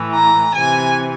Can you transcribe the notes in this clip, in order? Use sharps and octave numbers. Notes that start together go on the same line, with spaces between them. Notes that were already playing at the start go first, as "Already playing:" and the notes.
Already playing: A2 E3
A#5
C3 E3 G#5